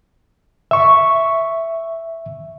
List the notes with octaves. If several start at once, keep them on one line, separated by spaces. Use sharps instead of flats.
E5 C#6